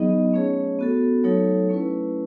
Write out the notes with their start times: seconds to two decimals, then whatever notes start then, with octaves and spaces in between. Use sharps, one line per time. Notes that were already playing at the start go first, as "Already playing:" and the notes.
Already playing: F#3 B3 D#4 G#4 D#5
0.33 A3 C#4 G#4 C#5
0.79 B3 F#4 A4
1.24 F#3 A3 D#4 A4 C#5
1.69 A3 C#4 E4 B4